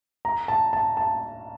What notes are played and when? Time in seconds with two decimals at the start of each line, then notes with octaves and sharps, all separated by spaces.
0.25 A#5
0.48 A5
0.73 A5
0.97 A5